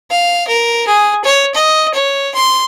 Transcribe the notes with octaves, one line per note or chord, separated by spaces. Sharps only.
F5
A#4
G#4
C#5
D#5
C#5
C6